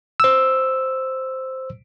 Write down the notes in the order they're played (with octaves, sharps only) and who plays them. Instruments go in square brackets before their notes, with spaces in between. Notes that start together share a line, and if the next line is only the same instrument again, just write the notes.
[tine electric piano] C5 E6